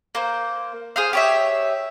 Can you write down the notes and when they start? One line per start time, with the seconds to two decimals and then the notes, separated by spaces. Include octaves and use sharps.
0.15 A#3 C5
0.96 G#4 C5 F5
1.13 G4 C#5 E5